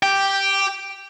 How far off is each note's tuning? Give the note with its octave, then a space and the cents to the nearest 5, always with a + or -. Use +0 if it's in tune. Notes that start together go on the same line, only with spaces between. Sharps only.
G4 +0 G5 +0